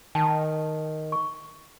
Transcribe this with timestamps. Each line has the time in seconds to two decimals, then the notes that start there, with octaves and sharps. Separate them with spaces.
0.15 D#3 G5 A5
1.12 C#6